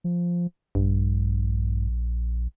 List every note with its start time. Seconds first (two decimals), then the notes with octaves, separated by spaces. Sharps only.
0.04 F3
0.75 A#1 G2